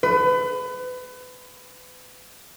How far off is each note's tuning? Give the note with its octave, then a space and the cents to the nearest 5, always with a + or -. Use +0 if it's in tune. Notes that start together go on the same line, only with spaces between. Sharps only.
B4 +30